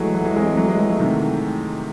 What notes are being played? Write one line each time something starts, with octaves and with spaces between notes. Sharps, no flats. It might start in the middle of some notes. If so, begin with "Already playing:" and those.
Already playing: E3 F#3 G#3 A3
F#3 A3
E3 G#3
G#3 C4
G#3 C4
F#3 A3
E3 G#3
E3 G#3
F#3 A3
C3 D#3